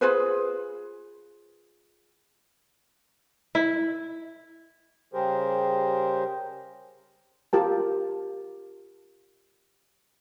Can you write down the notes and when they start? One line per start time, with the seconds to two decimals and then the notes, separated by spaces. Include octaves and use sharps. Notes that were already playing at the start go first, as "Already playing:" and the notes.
0.01 F4 G#4 B4 C5
3.55 E4
5.13 C#3 G3 G4 G#4 A#4 C5
7.53 F4 G4 A#4 A5